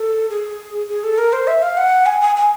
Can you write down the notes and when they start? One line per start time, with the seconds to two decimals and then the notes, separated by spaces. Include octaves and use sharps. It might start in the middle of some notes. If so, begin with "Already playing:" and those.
Already playing: A4
0.30 G#4
0.89 G#4
1.04 A4
1.18 A#4
1.33 C5
1.47 E5
1.62 F5
1.77 F#5
2.06 G#5
2.21 G#5
2.36 G#5